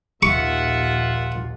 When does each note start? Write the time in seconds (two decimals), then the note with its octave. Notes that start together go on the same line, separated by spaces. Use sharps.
0.23 A#1 D#2 A#2 F4 E5 F#5 C#6